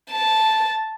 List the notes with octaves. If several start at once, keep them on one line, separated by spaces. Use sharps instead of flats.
A5